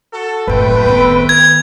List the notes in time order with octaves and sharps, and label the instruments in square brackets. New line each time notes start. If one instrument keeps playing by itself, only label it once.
[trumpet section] F#4 A4
[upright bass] F#1 A2 [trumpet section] A3 C4 G5 [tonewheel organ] B4
[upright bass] D#3 B3
[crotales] G#6